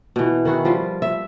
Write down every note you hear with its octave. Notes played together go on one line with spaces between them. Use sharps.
B2 E3
D#3 E4 F#4 G#4
F3 G3 F4
E5